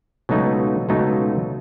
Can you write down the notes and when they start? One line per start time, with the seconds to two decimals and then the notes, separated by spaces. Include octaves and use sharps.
0.29 C#2 B2 F#3 A3 D#4
0.89 C#2 B2 F#3 A3 D#4